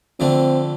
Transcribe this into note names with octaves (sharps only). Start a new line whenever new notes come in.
F2 D3 A3 C4